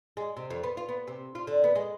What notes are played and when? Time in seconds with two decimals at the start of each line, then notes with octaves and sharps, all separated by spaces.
0.17 G#3
0.37 C3
0.50 F2
0.63 B3
0.77 F4
0.89 B3
1.07 C3
1.35 F4
1.47 D3
1.64 B3
1.76 G#3